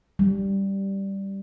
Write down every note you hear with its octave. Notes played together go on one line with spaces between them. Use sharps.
G3